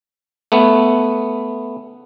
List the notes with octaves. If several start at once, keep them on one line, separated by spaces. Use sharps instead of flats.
A3 B3